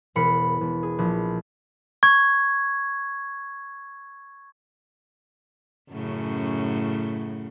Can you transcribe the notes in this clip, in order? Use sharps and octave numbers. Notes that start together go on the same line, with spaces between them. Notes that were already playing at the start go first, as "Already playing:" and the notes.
E1 A#4 B5 C7 C#7
E1
G#4
A#1
C#6 G#6
F#2 A2 C#3